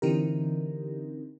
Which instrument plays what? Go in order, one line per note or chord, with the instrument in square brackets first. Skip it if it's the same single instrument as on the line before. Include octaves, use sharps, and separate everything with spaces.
[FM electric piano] D3 E3 C4 D#4 G4 A#4